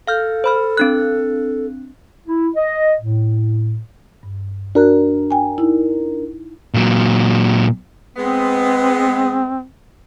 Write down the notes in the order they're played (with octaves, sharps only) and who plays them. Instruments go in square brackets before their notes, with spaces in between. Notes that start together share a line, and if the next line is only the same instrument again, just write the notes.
[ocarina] A4 [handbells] F5 F6 G6
[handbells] C5 B5 F6
C4 D4 F#6
[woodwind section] E4
D#5
A2
[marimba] G2
[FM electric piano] D4 A#4 [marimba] F#4 F#6
[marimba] G5 G#5
D#4 E4
[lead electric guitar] A#2 F#3
[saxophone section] G#3 B3 [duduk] C4